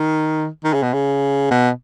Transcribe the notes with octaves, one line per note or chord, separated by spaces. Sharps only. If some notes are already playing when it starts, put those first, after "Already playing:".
Already playing: D#3
D#3
C#3
B2
C#3
B2